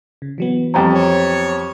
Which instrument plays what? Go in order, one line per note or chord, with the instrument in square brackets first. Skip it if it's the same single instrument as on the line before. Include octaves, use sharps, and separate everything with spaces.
[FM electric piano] C#3
E3 F#3 B3
[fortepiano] F2 G3 C4 [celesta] G5 A#5
[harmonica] C#5